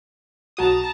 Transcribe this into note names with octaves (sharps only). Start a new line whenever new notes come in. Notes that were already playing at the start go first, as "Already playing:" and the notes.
B1 F#4 A5 A#5 D#6